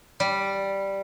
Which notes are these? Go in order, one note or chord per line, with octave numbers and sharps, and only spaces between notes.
G3